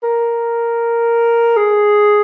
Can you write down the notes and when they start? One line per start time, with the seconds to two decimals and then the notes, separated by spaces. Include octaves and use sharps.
0.03 A#4
1.57 G#4